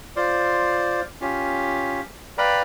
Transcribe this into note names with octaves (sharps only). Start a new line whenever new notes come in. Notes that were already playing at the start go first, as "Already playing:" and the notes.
F4 C5 D5
C#4 F4 G4
B4 D5 F5 G5 A#5 B5